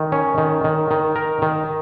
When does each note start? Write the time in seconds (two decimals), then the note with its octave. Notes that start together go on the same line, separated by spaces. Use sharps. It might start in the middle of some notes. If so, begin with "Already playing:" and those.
Already playing: D#3
0.12 C#4
0.38 D#3
0.64 D#3
0.91 D#3
1.16 A#4
1.42 D#3